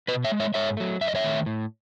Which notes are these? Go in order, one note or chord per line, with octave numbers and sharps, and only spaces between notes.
B2 B4 D#5
C#5 E5
G#3
C#5 E5
G#2 C#5 E5
F#3 A3
F#2 E5
D#5
C#5 E5
D#3 A3
A2